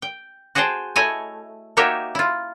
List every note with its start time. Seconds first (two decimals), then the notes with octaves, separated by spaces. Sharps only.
0.02 G5
0.55 F#4 G#4 C5 F#5 G5 A5
0.96 A3 E4 C#5 D#5 G#5
1.77 A#3 D#4 F#4 G4 C#5 E5
2.15 E4 F4